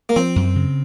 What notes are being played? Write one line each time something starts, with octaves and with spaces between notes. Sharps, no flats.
A#3
F3 C4
F#2
C#3